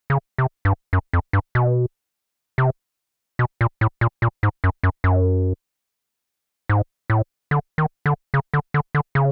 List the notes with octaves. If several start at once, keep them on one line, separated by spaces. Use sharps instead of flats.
C#3
C3
G2
F#2
F2
G2
B2
C3
B2
A#2
A2
A#2
A#2
G#2
F#2
F#2
F#2
G#2
A2
D3
D#3
D3
C#3
D3
D3
D3
C#3